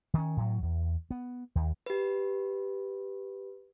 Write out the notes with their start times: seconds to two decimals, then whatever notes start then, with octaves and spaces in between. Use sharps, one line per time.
0.14 D#3 C#4
0.37 A2 F#3
0.62 E2
1.11 B3
1.55 D#2
1.86 G4 B4